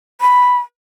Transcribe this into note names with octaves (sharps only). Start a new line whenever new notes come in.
B5